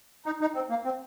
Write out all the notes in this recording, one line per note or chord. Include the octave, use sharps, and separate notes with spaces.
D#4
D#4
C4
A#3
C4